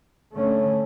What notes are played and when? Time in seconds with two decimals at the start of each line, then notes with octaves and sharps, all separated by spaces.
0.34 D3 A3 C#4